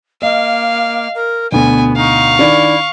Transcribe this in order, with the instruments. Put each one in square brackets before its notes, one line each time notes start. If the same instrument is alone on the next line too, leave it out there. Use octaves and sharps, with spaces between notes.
[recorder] A#3 [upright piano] D#5 [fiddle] F5
[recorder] A#4
[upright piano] D2 B2 [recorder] B3 [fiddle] G#5
[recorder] D#4 [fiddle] F5 C#6
[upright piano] D#3 D4 [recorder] E4